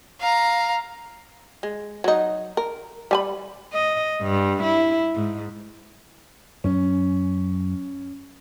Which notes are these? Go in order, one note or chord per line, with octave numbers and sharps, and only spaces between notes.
F5 A#5
G#3
F#3 D#4
A#4
G3 G#5 B5
D#5
G2
E4
G#2
F#2 F#3 C#4